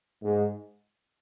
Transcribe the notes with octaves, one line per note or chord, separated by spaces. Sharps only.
G#2